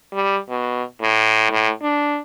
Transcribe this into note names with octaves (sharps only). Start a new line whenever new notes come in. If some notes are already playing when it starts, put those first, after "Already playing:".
G3
B2
A2
A2
D4